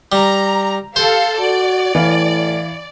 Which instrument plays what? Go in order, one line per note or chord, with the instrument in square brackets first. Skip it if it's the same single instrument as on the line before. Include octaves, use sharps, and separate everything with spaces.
[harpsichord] G3 [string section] A#5
[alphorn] G4 [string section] A4 F5 [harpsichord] C5
[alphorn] F#4 [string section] D5
[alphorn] A2 [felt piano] E3 F5